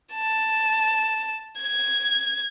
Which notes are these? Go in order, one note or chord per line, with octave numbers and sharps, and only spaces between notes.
A5
G#6